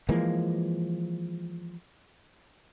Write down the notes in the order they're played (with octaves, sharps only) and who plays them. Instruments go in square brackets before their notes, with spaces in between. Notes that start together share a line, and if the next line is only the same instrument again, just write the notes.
[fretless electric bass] E3 F3 G#3 A#3